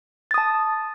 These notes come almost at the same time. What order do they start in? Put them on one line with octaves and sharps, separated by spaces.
A6 D#6 A5